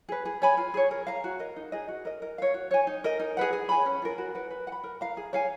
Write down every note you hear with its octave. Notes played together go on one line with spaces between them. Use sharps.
G#4 B4
G#4
C#5 G#5 B5
F4
G#4 C#5
A#4
F5 A#5
F#4
A#4 D#5
D#4
G#4 D#5
F#4
A#4 D#5
A#4
C#5 F5
F#4
C#5 G#5
D#4
A#4 D#5
D#4
G#4 B4 F#5
G#4
C#5 G#5 B5
C#4
F4 A#4
F#4
B4 F#5
B4
F#5
B5
A#4
F5 A#5
G#4
C#5 F5 G#5